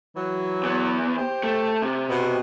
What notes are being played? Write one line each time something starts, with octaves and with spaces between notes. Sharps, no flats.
E3 F#3
E2 B3
G4 C5
A3
C3
B2